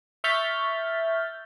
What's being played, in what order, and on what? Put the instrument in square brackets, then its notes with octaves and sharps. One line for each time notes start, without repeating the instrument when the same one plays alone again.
[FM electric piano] E5 C#6 F6 G6 A6 B6